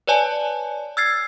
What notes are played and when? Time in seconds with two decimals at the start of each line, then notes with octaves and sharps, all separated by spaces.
0.07 B4 C#5 D5 G#5 A5
0.97 E6 F6 G#6 A6 C7